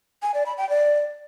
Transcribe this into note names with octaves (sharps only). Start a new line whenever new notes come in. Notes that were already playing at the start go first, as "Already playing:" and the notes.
G#5
D5
B5
G5
D5